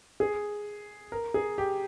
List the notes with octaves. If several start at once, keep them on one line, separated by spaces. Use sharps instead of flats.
G#4
A#4
G#4
G4